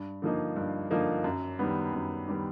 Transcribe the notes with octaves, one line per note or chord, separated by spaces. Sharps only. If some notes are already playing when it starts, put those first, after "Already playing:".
Already playing: G2
D3 F3 A#3 D#4
G2
D3 F3 A#3 D#4
F#2
D#3 G3 B3
F#2
D#3 G3 B3